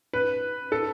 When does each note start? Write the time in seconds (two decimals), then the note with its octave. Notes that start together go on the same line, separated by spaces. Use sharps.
0.13 B4
0.72 A4